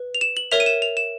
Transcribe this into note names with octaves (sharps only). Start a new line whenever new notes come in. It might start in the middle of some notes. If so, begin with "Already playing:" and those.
Already playing: B4
F7
E7
F#7
A#4 C#5 E5 F7
D#7
E7
F7
E7